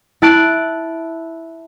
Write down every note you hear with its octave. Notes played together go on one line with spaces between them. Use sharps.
E4 A5 F#6 D7